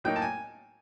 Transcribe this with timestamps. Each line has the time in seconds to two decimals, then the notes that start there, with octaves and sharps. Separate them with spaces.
0.04 A2 F#3 A#3 D#4 G5
0.16 A5
0.22 G#5